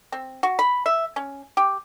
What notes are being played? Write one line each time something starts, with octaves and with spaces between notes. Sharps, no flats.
C4
F#4
B5
E5
C#4
G4